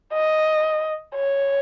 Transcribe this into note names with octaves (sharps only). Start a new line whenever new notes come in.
D#5
C#5